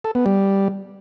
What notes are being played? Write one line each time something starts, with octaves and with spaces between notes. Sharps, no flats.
A4
B3
G3